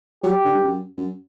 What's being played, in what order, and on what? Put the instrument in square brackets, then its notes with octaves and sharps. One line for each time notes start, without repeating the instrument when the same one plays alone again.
[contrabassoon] F#3 [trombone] G4
[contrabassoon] D3
G2
F#2
F#2